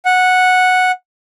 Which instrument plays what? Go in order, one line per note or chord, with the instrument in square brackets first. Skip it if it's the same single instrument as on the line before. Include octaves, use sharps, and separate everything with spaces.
[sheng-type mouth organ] F#5